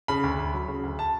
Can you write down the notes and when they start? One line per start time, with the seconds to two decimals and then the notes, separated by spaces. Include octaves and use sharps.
0.08 C#3 B5
0.23 D2
0.39 D2
0.54 F#3
0.68 C#3
0.83 D2
0.99 A5